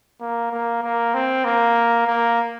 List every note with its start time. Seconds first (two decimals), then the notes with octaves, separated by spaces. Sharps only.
0.20 A#3
0.51 A#3
0.82 A#3
1.14 C4
1.44 A#3
2.07 A#3